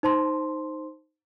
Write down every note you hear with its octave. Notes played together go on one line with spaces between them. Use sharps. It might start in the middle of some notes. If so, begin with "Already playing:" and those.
D#4 C5 A5 C6